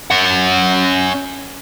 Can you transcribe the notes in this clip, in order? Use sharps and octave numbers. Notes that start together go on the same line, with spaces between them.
C#4 F#5